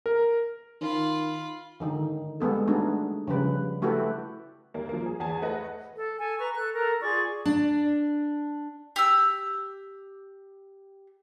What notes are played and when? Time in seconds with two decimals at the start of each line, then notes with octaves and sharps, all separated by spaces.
0.06 A#4
0.81 D#3 F4 B5
1.80 D3 D#3 D#4
2.40 G3 G#3 B3 A4
2.67 A3 B3 D4 D#4 F#4 G#4
3.28 C#3 F3 G3 B4
3.82 A3 E4 F#4 G4 A4 B4
4.74 D#2 A#3
4.89 F3 A#3
5.06 G#4
5.20 E2 G#4 G#5 A5
5.42 A3 B4 D#5 F#5 A#6
5.94 A4
6.18 A4 G#5
6.38 B4 A#5 C#6
6.55 A4 F#6
6.75 A4 A#4 A#5
7.01 F4 G#4 D5 C#6
7.45 D4
8.96 G4 E6